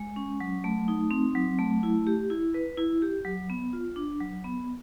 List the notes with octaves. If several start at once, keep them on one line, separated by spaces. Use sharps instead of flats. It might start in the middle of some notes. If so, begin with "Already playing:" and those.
Already playing: G#3
C#4
F#3
A3
D#4
C4
F#3
A3
E4
G4
E4
B4
E4
G4
F#3
B3
F4
D4
F#3
B3